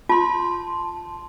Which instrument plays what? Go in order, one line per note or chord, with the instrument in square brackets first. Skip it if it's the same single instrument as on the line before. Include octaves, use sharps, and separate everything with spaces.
[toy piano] F4 [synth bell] A5 C6